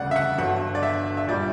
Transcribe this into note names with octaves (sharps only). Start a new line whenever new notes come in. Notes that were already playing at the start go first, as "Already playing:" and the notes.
Already playing: E1 D2 C#3 G3 D5 F#5
E5
F#5
G1 G2 F#3 F#5
D5
E5
E5
A#1 A#2 G3 D5